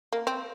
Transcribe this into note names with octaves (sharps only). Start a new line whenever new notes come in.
A#3
C4